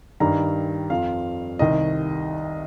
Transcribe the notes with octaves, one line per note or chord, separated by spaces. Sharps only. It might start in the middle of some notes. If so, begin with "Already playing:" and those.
G2 D#3 G3 A#5
F2 F3 F5
C2 C3 D#3 D#5